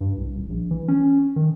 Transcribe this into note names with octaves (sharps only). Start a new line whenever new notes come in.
G2
C2
D#1
A#1
E3
C#4
D#3